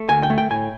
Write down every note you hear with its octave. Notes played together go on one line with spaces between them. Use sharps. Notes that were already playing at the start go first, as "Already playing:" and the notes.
Already playing: A3
D2 G#5
G5
A3
G5
A2 G#5